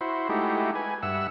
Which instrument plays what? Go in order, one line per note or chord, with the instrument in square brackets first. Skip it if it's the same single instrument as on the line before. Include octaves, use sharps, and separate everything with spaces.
[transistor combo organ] E4 F#4 C5
G#3 A3 D#4 E4 F#4 G4
B4 G#5
G2 E5 F#5 E6